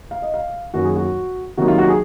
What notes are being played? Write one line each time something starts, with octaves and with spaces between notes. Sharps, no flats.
F5
D#5
F5
F#2 D#3 A#3 F#4
G#4
F#4
C3 D#3 F#3 A#3 D#4 F#4
F4
F#4
G#4